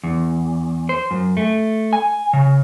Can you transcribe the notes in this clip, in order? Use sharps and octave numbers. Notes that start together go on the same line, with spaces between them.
E2
C5
F#2
A3
G#5
C#3